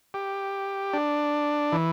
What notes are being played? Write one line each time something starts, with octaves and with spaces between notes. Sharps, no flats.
G4
D4
E3